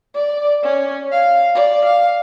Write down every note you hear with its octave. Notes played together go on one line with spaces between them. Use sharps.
D5
C#4
F5
D5
F5